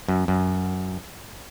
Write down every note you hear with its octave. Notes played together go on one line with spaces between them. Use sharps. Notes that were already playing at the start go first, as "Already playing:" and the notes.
F#2
F#2